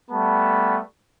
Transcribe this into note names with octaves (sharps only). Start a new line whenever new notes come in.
G3 A3 B3 A5 B5